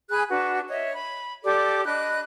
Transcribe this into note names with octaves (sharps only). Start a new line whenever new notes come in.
G#4 G#5 B5 F#6
D4 F#4 B4
C#5 D#5 E5
B5
G4 A4 D5 D6
D4 D#5 B5 F#6